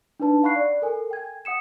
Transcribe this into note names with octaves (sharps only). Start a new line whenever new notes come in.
D4 D#4 B4 A5
F5 F#5 B5 C#6 F#6 C7
D5
A4 A#4 G#5
G5 G#6
F#5 D#6 C#7 E7